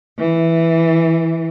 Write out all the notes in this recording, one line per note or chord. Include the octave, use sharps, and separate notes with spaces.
E3